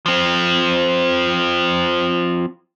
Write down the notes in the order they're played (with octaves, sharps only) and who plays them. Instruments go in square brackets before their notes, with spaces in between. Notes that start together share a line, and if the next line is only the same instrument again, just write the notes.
[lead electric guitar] F3 C4